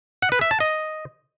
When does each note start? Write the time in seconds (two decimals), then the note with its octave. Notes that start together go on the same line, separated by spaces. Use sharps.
0.22 F#5
0.32 B4
0.41 E5
0.51 A5
0.60 D#5